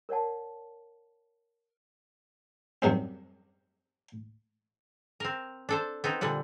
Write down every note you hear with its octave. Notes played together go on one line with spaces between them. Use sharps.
A#4 C#5 D5 F#5 A5
F#2 C3 G3 C4
C4 A#4
D4 A4 C5
B3 C4 D#4
A#2 D3 G3 F#5